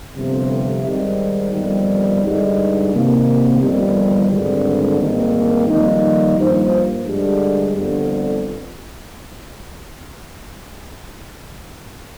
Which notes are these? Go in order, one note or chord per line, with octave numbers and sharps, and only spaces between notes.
G1 F2 C3
G#2 D#3 G3
G1 F2 D#3 G3
G2 D3 G#3 D#4
C3 D#3 A#3
G1 F2 D#3 G3
G#1 G2 D3
G#1 G2 D#3 A#3
F2 D#3 G3 A#3 D#4
G2 F3 A#3 F4 C5
G2 D3 G#3 D4 G4
G1 F2 D3